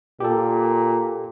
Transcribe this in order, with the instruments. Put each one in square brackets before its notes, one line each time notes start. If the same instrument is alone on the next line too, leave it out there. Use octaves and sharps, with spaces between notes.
[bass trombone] A#2 [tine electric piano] G4 A4